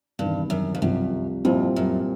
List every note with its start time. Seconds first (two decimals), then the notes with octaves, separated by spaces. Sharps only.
0.19 E2 G2 C3 D#3
0.50 F#2
0.75 F2
0.82 C2 F#2 C3 F3
1.45 F2 A#2 G3 C4 E4
1.76 F#2